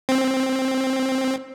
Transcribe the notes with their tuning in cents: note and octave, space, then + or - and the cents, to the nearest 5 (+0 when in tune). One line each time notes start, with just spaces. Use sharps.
C4 +10